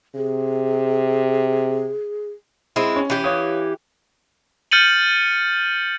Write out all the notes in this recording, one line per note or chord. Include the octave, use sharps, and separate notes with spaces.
C3 G#4
G#3 C4 E4
C#4
E3 G4
C#5 F5 D#6
F6 G6 A6 C#7 D#7 F#7